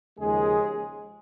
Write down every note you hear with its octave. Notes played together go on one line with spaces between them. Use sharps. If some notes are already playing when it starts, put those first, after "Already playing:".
D#2 C#3 F3 G#3 G#4